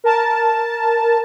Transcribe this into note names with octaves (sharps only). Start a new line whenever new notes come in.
A#4 A5